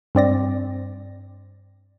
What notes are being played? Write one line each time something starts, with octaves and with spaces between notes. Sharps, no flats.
G2 C4 D5 A#6